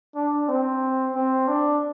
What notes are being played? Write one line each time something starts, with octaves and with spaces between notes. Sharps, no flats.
D4
C4
C4
D4